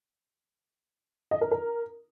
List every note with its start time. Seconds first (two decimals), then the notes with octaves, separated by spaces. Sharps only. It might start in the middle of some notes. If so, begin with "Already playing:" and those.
1.31 D#5
1.41 A#4
1.51 A#4